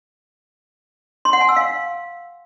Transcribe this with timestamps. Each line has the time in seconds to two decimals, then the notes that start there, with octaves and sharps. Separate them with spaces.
1.25 C6
1.33 F#5
1.41 G#5
1.49 E6
1.57 F5